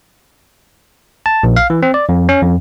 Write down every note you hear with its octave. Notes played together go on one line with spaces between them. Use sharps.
A5
A#1
F5
E3
C4
D5
F2
C#4
F2